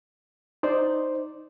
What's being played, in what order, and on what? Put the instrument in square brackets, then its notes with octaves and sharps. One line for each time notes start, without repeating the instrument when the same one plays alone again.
[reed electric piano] D#4 C5 D5